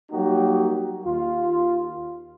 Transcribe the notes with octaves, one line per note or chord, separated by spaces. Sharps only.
F#3 G3 A#3 D#4 F#4 G4
D#2 F4